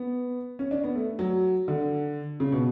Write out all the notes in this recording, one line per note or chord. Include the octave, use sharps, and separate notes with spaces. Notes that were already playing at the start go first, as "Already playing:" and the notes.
Already playing: B3
C#4
D4
B3
A3
F#3
D3
C#3
B2